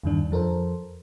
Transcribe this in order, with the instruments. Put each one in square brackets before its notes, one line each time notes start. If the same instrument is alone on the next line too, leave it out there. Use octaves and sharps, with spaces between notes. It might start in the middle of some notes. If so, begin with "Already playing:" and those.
[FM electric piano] E2 G2 D3 D#3 D4
F2 F3 A4 A#4 C5